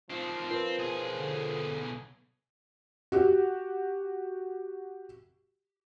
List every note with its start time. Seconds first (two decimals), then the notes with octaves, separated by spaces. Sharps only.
0.10 D#3 F3 C4
0.50 C4 F4 A#4 B4
0.79 B1 G#4
1.19 D3
3.12 F#4 G4